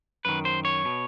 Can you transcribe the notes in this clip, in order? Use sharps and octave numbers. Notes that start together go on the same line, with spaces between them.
F#2 D#3 B4
C5
C#5
B2